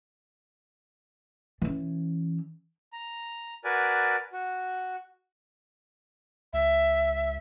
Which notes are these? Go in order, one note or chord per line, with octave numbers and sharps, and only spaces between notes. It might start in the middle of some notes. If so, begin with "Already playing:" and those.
E3 C#4
A#5
F#4 A#4 B4 D5 G#5
F#4
C#2 E5